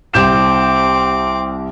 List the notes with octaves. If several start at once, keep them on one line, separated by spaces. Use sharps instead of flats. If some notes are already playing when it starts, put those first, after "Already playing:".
C2 C4 D6 G6 E7